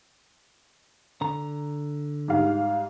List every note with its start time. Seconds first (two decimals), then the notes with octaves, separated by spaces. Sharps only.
1.21 D3 A#5
2.28 G#2 G3 F5